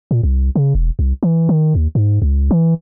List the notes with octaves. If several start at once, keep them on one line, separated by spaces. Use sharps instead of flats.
A#2
C2
C#3
E1
C2
E3
D#3
D#2
G#2
C#2
E3